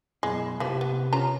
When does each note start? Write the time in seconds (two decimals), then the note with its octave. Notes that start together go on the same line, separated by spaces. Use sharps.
0.23 F#2 B2 G#3 E4
0.60 C3 E3 F3 G4 B4
0.81 B3
1.13 C#4 F4 A#5